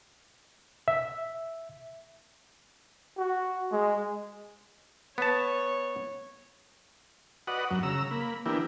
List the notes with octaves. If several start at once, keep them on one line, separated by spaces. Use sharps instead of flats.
E5
F#4
G#3
B3 C#5 A5
F#4 B4 D5 D#5 F#5
F#2 F#3
C#3 A#5 E6
A#3 B5
E3 B3 D4 E4 G4 A#4